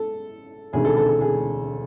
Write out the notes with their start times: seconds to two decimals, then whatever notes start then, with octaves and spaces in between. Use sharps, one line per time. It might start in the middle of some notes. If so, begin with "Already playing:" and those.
Already playing: A4
0.73 E1 D2 C3 D#3 G#4
0.84 A4
0.97 A4
1.09 A4
1.21 G#4